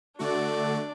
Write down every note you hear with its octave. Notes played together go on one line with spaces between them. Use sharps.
D3 A3 D4 F#4 D5